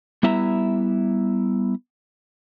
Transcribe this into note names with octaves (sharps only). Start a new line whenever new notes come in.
G3 B3 E4 E5 A#5